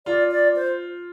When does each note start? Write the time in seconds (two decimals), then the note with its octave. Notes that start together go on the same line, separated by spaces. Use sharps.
0.06 F4 D5
0.31 D5
0.56 C5